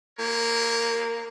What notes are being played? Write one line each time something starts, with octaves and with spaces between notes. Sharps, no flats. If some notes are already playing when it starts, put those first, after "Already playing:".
A#3 G4 A#4 C#5